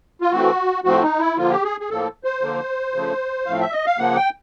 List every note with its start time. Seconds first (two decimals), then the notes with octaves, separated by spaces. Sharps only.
0.21 F4
0.31 E3 A3 C4 F#4
0.84 A2 F3 A3 C4 F#4
1.02 D#4
1.19 E4
1.37 D3 F3 A#3 F4
1.50 G4
1.63 G#4
1.80 G#4
1.90 A2 F3 A#3 A4
2.24 C5
2.42 D3 F3 A#3
2.94 C#3 F3 A3
3.46 A2 F3 A3 C4 F5
3.60 E5
3.72 D#5
3.86 F5
3.98 C#3 F3 A#3 F#5
4.16 G5